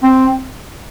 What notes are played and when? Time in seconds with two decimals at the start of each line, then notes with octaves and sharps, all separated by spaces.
0.03 C4